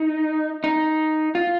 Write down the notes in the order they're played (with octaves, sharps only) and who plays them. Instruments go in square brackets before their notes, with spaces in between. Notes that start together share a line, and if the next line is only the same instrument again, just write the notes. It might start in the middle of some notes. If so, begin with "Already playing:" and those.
Already playing: [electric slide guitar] D#4
D#4
F4